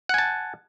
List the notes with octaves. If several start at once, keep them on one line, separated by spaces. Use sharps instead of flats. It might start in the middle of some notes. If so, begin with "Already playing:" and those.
F#5 G#5 A5